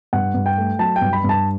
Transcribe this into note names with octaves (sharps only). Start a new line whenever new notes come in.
G2 F#5
G2
G5
A3
F#3 A5
G5
G2
B5
G2
A5